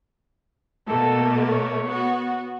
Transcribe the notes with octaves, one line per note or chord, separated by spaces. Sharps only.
B2 A3 A#3 A4
C#5
B3 F#4